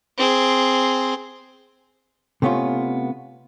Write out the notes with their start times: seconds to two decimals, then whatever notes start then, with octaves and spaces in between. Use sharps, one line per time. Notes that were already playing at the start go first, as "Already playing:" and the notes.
0.18 C4 G#4
2.42 C3 A3 B3 C#4 F4